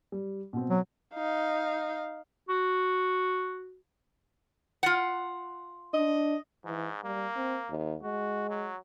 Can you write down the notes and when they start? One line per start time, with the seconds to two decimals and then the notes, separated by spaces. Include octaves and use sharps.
0.12 G3
0.53 B2 C4
0.70 F#3
1.14 D#4 F5
2.49 F#4
4.83 F4 F#5
5.94 D4 D#5
6.65 G#2 E3
7.04 G3 A#3
7.36 C4
7.70 D#2
8.03 G#3 F#4
8.49 F#3